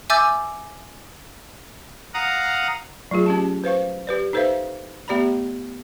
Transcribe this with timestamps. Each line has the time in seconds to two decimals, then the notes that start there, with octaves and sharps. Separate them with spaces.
0.10 E5 G#5 D6 E6 G6 A6
2.14 F5 F#5 A#5 D#6
3.11 F#3 A3 F4 G#4
3.26 C#4 G4 A5
3.64 B4 C5 F5 C#6
4.07 G4 B4 D5
4.33 D#4 A4 B4 C5 E5 F5
5.08 A3 B3 G4 D5 A#5 B5